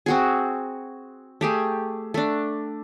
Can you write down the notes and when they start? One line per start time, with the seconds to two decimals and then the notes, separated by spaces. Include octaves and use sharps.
0.06 C4 F#4 G#4
1.41 A3 G4 G#4
2.14 A3 D4